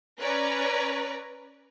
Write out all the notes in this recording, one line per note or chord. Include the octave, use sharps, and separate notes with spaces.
C#4 B4 C#5 D5 A#5